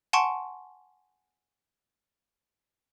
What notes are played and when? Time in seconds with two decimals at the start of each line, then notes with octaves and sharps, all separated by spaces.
0.13 F#5 G#5 A5 C6 C#6 D7